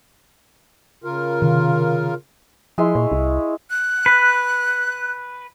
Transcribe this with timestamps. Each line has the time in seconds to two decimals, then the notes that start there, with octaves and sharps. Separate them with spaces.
1.04 C#3 F4 A#4
1.42 C3 D#3
2.78 F3 G#3 E4 C6
2.95 A#2 C#5
3.12 C2
3.70 F#6
4.06 B4